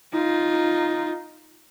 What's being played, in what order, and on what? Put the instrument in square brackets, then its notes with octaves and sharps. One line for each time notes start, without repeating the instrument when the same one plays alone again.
[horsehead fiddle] D#4 F4